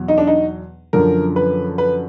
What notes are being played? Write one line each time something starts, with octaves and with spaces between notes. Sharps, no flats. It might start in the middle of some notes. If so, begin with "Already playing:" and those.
Already playing: E2 B2 F#3
D#4
D4
D#4
F#2 D3 F3 A#4
B4
B4